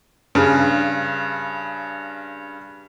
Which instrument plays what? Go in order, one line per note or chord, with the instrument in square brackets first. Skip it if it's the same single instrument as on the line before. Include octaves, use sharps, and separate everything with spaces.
[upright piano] G2 C#3